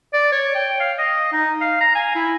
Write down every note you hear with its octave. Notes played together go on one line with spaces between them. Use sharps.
D5
C#5
G5
F5
D#5
D#4
F5
A#5
G#5
E4